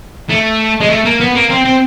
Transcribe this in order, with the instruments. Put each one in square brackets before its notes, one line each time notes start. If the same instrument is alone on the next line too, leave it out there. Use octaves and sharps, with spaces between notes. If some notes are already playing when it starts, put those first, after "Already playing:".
[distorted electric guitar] A3
G#3
A3
A#3
B3
A#3
C4
C4